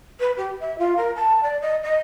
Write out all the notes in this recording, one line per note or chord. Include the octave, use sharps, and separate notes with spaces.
B4
G4
E5
F4
A#4
A5
D5
D#5
D#5